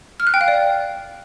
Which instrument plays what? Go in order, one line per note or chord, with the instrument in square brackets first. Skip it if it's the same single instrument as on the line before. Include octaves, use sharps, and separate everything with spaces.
[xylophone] F6
F#6
G5
F5
D5